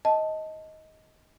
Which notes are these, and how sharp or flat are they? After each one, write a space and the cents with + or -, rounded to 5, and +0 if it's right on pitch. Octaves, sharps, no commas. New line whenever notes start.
D#5 +15 A5 +0